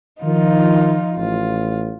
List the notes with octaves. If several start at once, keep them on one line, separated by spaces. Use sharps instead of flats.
D#3 F3 D#4 F4
A1 F4